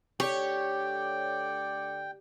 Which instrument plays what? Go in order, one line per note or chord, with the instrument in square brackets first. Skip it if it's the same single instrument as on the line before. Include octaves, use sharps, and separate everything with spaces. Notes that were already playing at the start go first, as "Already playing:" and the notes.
[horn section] D3 A3 D5 [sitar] G4 [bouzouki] C#5 [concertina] G5